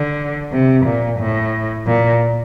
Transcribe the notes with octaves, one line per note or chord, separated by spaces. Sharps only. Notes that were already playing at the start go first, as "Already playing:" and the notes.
Already playing: D3
C3
A#2
A2
A#2